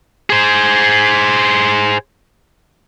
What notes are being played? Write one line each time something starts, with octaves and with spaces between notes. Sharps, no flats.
G#4 C5